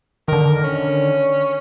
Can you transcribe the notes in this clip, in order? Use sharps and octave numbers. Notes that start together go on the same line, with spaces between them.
D3 D#3 A#4
C#4